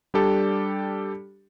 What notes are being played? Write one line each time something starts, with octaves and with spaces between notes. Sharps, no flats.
G3 D4 G4 A4